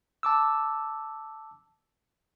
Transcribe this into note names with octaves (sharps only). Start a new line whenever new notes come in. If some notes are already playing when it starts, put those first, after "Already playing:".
A5 D6 E6